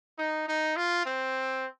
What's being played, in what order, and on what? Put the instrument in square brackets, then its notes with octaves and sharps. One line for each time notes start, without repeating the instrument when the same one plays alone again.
[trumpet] D#4
D#4
F4
C4